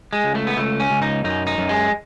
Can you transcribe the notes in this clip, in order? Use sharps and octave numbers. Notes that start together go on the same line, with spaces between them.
G#3
C#2
A3
B3
C#2 A3
C#4
C#2
D#4
F#2 D#4
D#4
F#2
G#3